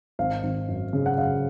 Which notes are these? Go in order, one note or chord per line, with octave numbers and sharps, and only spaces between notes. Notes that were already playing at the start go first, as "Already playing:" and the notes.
G#1 F5
G#1
F#2
C#3
F#5
F#2 F5